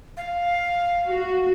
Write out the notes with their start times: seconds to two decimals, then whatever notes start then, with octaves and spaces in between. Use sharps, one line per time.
0.17 F5
1.07 F#4